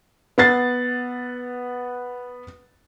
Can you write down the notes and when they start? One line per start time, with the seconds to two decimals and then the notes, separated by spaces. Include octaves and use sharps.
0.38 B3 F#5 A6 C7